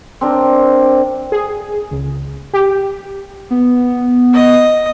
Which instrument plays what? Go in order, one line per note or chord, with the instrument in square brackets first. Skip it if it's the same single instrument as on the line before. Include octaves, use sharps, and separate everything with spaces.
[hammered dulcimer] C4 D4 A#4
[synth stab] G#4
C#2
G4
[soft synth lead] B3
[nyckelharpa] D#5